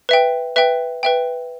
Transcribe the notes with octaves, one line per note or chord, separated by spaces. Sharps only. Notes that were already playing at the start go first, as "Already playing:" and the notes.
B4 E5 G5
B4 E5 G5
B4 E5 G5